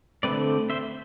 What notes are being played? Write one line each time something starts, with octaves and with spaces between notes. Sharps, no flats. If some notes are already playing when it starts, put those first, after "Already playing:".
D3 A3 C4 B4 D5
C5 E5